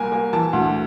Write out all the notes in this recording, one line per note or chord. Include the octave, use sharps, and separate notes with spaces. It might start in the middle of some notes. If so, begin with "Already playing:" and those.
Already playing: C2 A#3 G#5
A#3
E3 A5
D2